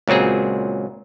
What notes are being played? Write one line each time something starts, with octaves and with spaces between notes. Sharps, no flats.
C#2 A#2 F#3 C4 G#4